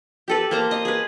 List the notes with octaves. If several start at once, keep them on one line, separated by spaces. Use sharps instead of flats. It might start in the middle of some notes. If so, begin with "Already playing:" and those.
G4 A4 B4
A#3 C5 A#5
D#5
G#4 B4